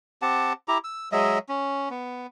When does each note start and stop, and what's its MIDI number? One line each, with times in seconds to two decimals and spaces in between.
0.22 0.53 60
0.22 0.53 67
0.22 0.53 78
0.22 0.53 81
0.68 0.78 64
0.68 0.78 67
0.68 0.78 82
0.84 1.09 88
1.12 1.38 54
1.12 1.38 56
1.12 1.38 75
1.12 1.38 76
1.49 1.89 61
1.90 2.27 59